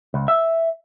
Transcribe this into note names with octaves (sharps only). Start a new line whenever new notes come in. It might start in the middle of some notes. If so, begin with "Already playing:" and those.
C#2
E5